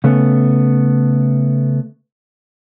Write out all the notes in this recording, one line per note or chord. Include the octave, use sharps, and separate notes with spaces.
C#3 A3 B3